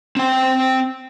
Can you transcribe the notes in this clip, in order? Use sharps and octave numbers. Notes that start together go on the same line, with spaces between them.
C4 G5